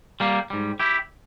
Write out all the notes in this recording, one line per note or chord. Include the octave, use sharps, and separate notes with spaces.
G3 A#3
G#2 G3
E4 G4